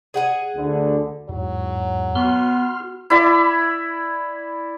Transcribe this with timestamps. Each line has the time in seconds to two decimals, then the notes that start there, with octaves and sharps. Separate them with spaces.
0.14 G#4 F#5 G#5
0.55 D2 D3
1.29 E2 G#2 F#3
2.15 B3 F#4 C6 F6
3.10 E4 D5 B5